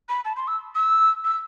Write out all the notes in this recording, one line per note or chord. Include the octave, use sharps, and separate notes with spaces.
B5
A5
C6
E6
E6
E6